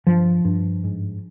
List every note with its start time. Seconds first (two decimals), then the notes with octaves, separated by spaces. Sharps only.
0.07 G2 F3
0.45 G2
0.84 G#2